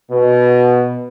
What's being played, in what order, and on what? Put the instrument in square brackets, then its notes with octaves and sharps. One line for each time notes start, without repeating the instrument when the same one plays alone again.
[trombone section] B2